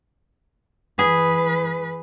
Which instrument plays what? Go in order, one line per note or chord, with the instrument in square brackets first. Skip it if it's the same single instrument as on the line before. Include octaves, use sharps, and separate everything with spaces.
[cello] E3 B4 [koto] G#4